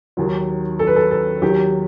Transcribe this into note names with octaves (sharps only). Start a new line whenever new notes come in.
D#2 D#3 F#3
A4
B4
A4
A4
D#2 D#3 F#3 G4